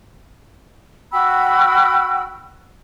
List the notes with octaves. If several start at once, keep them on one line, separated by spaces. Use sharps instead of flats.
F#4 G5 B5 E6